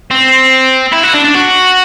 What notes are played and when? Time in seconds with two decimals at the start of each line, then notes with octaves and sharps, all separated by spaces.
0.11 C4
0.93 E4
1.04 F#4
1.14 D4
1.24 D4
1.34 F#4